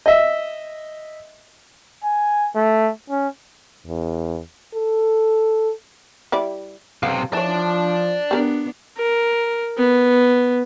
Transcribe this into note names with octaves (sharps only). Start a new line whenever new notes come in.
D#5 E5
G#5
A3
C#4
E2
A4
G3 E4 D5
B1 C3 F5 F#5
E3 F3 C#5 D5 A5
B3 D4 G4 A4 A#4
A#4
B3